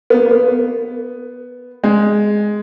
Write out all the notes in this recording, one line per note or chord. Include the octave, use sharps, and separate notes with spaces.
B3
A#3
A#3
B3
B3
G#3